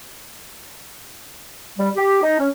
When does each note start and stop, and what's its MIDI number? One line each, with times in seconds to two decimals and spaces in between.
1.79 1.89 55
1.95 2.19 67
2.22 2.37 63
2.39 2.48 61